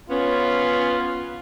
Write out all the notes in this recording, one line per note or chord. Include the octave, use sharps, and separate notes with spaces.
B3 C#4 F4